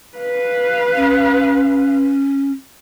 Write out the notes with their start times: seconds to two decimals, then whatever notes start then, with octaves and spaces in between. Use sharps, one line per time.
0.18 B4 F5
0.95 C#4